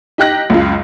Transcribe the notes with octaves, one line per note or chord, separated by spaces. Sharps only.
D#4 G4 F#6 A#6
C#2 F#2 F4